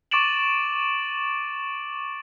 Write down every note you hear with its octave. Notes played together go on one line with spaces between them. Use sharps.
C#6 D6 A6 D7 E7 F#7